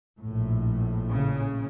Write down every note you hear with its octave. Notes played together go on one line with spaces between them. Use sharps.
A#1 A2
C#3